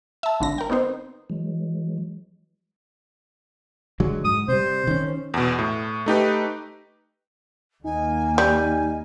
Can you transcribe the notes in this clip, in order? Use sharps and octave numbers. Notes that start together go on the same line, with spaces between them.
E5 A5
G#1 D3 A#6
A#4 G5
B3 C4 D#4 C5
E3 F#3 G#3
D3 F#3 G#3
G#2 D#6
C3 G3 C5
D#3 C#4
E2 B2
A2
A3 D#4 G4 B4
D#2 A#3 D#4 G#5
G3